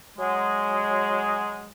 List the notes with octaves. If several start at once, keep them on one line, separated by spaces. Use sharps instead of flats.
F#3 G#3